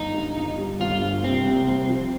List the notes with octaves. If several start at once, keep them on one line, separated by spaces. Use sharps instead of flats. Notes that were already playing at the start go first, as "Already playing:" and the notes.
Already playing: G1 D#4
G2
G1
G3
G1 F4
G2
C2 C4
C2
C2
F3